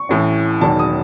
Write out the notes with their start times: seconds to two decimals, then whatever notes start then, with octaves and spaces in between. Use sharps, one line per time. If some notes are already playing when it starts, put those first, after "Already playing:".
Already playing: C#6
0.09 A1 A2 E3
0.61 E1 E2 D#3 F#3 A5
0.79 D#6